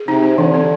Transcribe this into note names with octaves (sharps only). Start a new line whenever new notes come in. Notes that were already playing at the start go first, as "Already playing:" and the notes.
Already playing: G#4
C3 D#4
C4
D3 E3
C4